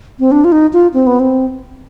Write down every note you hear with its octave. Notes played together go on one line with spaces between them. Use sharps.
C4
D4
F4
D#4
F4
C4
B3
C4